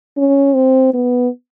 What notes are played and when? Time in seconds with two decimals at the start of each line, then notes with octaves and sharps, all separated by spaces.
0.18 C#4
0.55 C4
0.94 B3